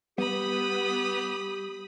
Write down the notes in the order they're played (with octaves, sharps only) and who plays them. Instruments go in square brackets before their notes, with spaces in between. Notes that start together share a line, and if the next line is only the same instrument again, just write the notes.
[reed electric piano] G3 [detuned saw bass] B3 [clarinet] G4 [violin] B5 D#6